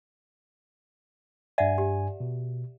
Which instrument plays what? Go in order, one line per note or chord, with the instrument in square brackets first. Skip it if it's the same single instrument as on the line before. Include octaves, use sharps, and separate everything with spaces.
[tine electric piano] G2 G#5 [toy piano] D5 E5 F#5
[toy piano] G4
[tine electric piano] B2